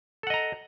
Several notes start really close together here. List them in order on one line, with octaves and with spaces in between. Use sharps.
A4 F#5 D#5 A#5